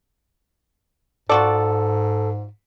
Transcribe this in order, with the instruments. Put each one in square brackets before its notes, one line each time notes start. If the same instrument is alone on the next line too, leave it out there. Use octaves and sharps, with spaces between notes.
[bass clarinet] G#2 [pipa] F4 F#4 D5 [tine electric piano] A4